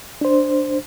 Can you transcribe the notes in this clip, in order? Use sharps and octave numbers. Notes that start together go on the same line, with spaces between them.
D4 C5